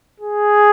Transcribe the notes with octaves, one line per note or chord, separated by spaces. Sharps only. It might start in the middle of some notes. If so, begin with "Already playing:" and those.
G#4